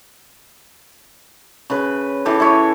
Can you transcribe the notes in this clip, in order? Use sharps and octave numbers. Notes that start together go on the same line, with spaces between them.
C#3 B4
E3 G4 A4
E4 G4 C#5